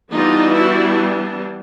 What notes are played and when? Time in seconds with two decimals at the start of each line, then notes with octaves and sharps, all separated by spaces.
0.12 E3 G3 B3 D4 D#4 F4
0.53 E4 F#4